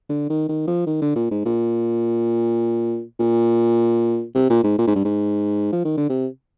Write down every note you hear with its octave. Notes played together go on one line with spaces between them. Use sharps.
D3
D#3
D#3
F3
D#3
D3
A#2
G#2
A#2
A#2
C3
A#2
G#2
A#2
G#2
G2
G#2
F3
D#3
D3
C3